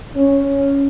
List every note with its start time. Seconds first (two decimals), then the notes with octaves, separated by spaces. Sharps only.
0.16 C#4